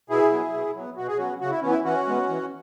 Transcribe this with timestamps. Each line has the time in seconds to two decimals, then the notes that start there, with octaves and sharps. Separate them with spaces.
0.09 B2 E4 G#4
0.31 F#3 B3
0.53 B2
0.75 F#3 B3
0.97 B2 F#4
1.08 G#4
1.17 F#3 B3 C#4 F#4
1.41 C#3 F#4
1.50 E4
1.61 E3 B3 C#4
1.70 E4
1.84 E3 C#4 F#4
2.07 G#3 B3
2.28 E3